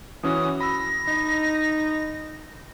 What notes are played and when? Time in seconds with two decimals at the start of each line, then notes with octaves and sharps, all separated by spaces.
0.23 E3 C#4 F#4 D#6
0.60 B5 E6 A#6
1.08 D#4